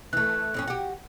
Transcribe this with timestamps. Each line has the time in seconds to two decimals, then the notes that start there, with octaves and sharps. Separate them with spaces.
0.13 E3 A3 F#6
0.54 F2 A2 C#4
0.67 F#4 G4